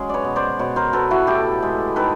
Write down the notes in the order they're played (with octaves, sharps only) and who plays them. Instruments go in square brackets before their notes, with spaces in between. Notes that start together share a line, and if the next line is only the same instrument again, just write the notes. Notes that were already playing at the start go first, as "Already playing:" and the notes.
Already playing: [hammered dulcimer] F#3 G#3 C#4 G#4
B4 C#5 D5
B2
C5 D5
B2 B4 C#5
A#4 C5
B2 A4 B4
E4 F#4
A2 G4 A4
G#3
D#3 A4 B4